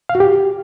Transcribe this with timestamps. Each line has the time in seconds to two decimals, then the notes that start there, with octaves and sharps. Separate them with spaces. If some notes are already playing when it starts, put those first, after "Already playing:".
0.09 F5
0.15 F#4
0.20 G4